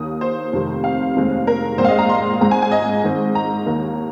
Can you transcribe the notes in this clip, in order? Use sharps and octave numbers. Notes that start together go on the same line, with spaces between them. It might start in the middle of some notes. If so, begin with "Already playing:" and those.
Already playing: D#2 D#3 A#3 D#6
C5
F1 F2 C3 D#3 A#3
F5
F1 D#2 D#3 G#3 C4
A#4
A#1 G#2 G#3 C4 C5
F5
D#5
A#5
C6
G#1 G#2 G#3 C4 A#5
G#5
G#5
D#5
G#2 D#3 C4
A#5
D#2 D#3 A#3